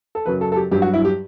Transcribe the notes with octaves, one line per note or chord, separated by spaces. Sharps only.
A4
F#2 C#3 F#3 B4
A4
A4
G4
G2 F#3 G4
F#4
E4
G4